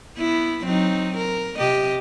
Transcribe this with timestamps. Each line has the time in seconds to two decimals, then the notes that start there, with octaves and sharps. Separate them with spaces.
0.17 B3 E4
0.64 F#3 C4 D#4
1.17 A#4
1.58 C3 G4 D#5